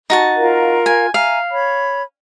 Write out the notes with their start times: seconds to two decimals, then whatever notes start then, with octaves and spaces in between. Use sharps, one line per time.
0.10 D#4 F#4 A5
0.38 F4 A#4 F5
0.86 G#5
1.14 E5 F5 G#5 A#5
1.51 C#5 B5